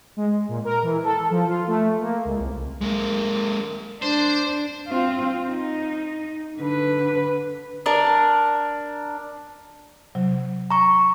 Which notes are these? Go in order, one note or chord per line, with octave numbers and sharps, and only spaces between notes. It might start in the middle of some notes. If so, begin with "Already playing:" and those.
G#3
A#2
A#4
E3
A4
F3
F4
A3
A#3
C#2
C2
G#3 A#3
D4 C5
C4 F4
D#4
D3 B4
D4 A#4
C3 F#3
A#5 C#6